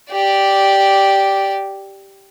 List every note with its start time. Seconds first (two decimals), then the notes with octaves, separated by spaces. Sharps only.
0.11 G4 D5